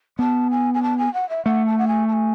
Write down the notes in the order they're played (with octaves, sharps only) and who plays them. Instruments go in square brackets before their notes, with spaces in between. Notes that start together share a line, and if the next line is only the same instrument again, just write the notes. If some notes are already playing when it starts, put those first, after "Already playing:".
[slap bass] B3 [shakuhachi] A5
[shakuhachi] G#5
G#5
A5
G#5
F#5
E5
[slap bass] A3 [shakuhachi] F#5
[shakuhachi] A5
F#5
G#5
A5
G#5